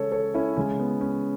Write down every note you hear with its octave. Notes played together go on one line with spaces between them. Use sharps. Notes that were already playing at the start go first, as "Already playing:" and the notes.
Already playing: C#3 G#3 A4 C#5
A4 C#5
C#4 E4
C#3 G#3 C#4
B3
C#4